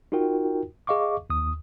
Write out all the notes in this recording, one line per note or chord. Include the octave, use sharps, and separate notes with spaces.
D#4 F4 F#4 A#4 G5
G#4 D#5 F5 C#6 D6
D#2 D#6